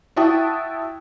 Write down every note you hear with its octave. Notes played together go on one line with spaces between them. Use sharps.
E4 F#4 E5 G5 A5 D#6